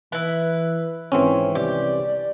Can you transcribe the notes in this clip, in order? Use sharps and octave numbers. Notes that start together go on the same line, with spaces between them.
E3 E4 B4
G#1 E3 C4 C#4 C#5
C2 G4 D5